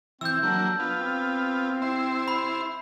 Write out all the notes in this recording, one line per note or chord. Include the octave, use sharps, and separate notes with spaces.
E3 C4 E6 G6
F#3 A#3 D4
B3 F4
C4
E4 C5 C6
B5